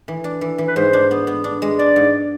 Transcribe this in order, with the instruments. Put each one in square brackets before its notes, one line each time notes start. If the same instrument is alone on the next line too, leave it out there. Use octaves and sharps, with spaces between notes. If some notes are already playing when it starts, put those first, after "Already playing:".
[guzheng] E3
D4
E3
E3
[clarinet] B4
[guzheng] G#2 [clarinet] C5
[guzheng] D4
B3
B3
D4
G#3
[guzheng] D4 [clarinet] D5
[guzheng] G#2